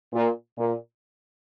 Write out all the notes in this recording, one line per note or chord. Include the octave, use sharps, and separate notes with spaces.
A#2
A#2